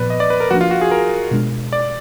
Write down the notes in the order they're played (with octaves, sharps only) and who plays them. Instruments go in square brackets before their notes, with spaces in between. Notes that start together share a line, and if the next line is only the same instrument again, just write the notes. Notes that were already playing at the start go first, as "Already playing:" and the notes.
Already playing: [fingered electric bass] A#2 F3 B3 [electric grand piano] B4 D5
[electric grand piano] D#5
D5
B4
A#4
[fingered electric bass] F3 A#3 D4 [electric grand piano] F#4
[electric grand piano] F4
F#4
G#4
A#4
[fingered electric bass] B2 G#3 D4
[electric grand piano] D5